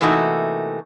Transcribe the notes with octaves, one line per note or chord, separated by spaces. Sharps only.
C3 E3 A3 A#3 D#4 F#4